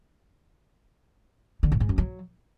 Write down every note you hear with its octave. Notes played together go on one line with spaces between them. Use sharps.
D3
A2
G#2
F#2
F#3